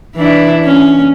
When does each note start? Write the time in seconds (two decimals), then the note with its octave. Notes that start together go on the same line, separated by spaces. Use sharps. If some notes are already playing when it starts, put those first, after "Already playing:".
0.16 E3 D4 E4
0.64 C#4